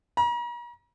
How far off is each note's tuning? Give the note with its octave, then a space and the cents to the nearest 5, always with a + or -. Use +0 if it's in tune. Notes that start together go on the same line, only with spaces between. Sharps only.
A#5 +45